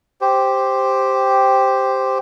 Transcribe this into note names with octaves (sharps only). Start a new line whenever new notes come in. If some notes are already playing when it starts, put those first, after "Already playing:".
G4 C5